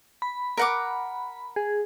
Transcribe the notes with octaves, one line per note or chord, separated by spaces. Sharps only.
B5
A#4 F#5 D6
G#4